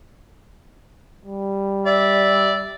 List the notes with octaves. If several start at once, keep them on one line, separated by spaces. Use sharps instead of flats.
G3
D5 E5